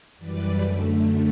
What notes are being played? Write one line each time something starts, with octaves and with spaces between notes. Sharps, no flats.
F#2 E3 G3 B4 D5
F#2 D3 A3